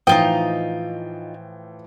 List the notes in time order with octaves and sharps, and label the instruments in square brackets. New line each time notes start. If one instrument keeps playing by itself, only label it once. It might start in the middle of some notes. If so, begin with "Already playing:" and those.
[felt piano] A2 E3 F3 [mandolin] D#4 F4 D#5 [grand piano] G5